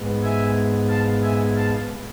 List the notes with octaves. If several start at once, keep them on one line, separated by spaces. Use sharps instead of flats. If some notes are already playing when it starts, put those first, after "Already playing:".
Already playing: G#2 G#3 B3
E5 G#5
F5 A5
E5 G#5
F5 A5